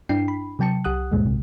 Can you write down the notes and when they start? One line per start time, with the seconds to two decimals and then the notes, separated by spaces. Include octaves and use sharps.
0.09 G2 D4 E4 G5 C7
0.28 B5
0.59 C3 F#3 G5 A5 C#7
0.84 C2 G4 F#5 D#6 F#6
1.11 D2 G2 A#2 G#3
1.25 B1 C3